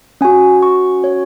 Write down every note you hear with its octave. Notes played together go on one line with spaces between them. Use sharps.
C#4 F#4 G#5
C#6
C#5